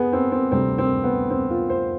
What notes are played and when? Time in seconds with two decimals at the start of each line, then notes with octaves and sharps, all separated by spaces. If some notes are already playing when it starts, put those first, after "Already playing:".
Already playing: B3 G#4
0.13 C4
0.32 C4
0.52 D2 C3 G3 C4
0.78 C4
1.04 B3
1.30 C4
1.50 F4
1.70 C5